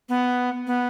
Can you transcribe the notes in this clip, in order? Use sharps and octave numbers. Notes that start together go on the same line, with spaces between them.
B3
B3